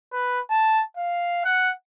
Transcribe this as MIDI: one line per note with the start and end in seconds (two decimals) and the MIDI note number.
0.12 0.40 71
0.50 0.83 81
0.97 1.40 77
1.45 1.70 78